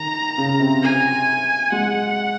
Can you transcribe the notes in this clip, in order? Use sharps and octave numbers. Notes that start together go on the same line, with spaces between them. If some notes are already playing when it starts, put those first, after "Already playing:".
Already playing: D#3 A#5
C#3
C3
G#5
G#3 F#5